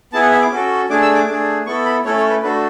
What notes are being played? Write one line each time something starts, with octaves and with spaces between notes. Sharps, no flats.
B3 E4 G#4 A5
F#5
E5
D6
C#4 F#4 A4
A3 D4 G#4 D6
E6
D6
A3 D4 G#4
B3 E4 A4 C#6
B5
A3 C#4 E4 A4 C#5
C#5
B4
A3 D4 F#4 A4 B4